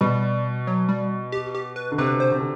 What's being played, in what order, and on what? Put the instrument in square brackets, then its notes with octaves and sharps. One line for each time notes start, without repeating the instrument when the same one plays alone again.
[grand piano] B2 [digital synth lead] G3
[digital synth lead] F#3
G3
G4
G4
B4
[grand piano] D3
[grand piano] C3 [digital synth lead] B4
[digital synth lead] C5
[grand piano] C3
D3